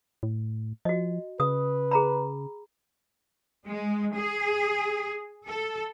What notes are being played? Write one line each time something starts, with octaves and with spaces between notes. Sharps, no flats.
A2
F3 F#4 D#5
C#3 B4 D#6
G#4 A#5 B5
G#3
G#4
A4